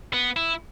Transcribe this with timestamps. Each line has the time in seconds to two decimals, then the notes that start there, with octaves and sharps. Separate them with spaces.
0.13 B3
0.36 E4